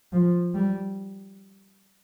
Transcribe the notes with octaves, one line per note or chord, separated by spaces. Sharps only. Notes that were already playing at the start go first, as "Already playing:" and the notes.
F3
G3